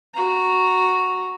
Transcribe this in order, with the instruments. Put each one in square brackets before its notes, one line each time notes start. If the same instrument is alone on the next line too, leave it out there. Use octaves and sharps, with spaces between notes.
[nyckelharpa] F#4 A#5